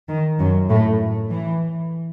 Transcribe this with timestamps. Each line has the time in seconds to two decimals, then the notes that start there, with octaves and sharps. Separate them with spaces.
0.09 D#3
0.39 F#2 F#3
0.70 A2 A3
1.31 E3